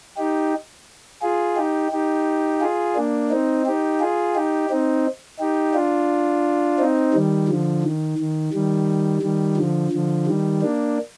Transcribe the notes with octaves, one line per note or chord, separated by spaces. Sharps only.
D#4 G4
F4 G#4
D#4 G4
D#4 G4
F4 G#4
A#3 D4
C4 D#4
D#4 G4
F4 G#4
D#4 G4
C4 D#4
D#4 G4
D4 F4
C4 D#4
D#3 G3
D3 F3
D#3
D#3
D#3 G3
D#3 G3
D3 F3
D3 F3
D#3 G3
A#3 D4